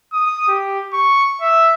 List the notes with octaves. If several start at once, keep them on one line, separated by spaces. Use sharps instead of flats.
D#6
G4
C#6
E5